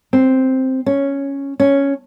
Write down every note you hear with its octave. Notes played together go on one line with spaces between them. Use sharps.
C4
C#4
C#4